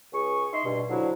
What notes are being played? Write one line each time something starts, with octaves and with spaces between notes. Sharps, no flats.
C#2 G#4 C#6
D#4 E5 C6
G2 B2
D3 F3 F#3 E4 F#4